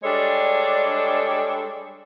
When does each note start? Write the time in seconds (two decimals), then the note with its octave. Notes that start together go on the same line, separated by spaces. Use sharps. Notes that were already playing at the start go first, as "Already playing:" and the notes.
0.03 G3 G#3 D4 A4 C#5